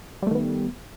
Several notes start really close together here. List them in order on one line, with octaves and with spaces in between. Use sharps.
G3 A3 D#3 B3